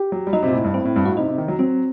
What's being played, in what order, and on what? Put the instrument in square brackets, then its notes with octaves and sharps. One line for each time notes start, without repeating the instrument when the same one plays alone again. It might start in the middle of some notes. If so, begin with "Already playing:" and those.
Already playing: [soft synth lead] G4
[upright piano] F#3
G3
[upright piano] F#3 [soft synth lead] D#4
[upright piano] C3
A#2
A2
G2
[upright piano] A2 [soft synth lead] C4
[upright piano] A2
G2
[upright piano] A2 [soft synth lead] F#4
[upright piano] C3 [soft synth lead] D#4
[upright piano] C3
D#3
F#3
[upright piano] F#3 [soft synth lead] C4